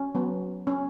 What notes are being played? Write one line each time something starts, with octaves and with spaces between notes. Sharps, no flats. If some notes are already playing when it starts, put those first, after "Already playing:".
Already playing: C#4
F#3 B3
C#4